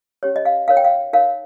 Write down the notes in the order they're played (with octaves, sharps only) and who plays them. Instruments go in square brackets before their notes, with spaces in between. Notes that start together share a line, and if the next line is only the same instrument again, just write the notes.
[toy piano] C#4 G4 C#5
D#5
F5
D#4 A#4 C#5 F5
G5
F5
D#4 A#4 C#5 F5